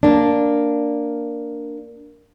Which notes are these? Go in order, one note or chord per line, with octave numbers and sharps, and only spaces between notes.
A#3 D4